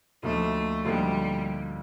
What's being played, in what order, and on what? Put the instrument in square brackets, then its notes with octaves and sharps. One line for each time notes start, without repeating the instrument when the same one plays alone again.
[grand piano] D2 D3 F3 A#3 D#4 [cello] A3
[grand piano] D2 D3 F3 A#3 D#4 [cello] G3